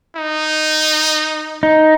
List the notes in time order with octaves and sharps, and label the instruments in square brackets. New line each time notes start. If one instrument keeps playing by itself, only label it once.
[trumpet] D#4
[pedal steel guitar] D#4